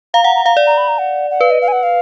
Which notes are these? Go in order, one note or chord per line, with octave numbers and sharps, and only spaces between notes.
F5 A#5
F#5 A#5
A#5
F5 A#5
D5
A#5
B5
A#5
F#5
F#5
B4 F5
D#5
F5
G#5
F#5
F5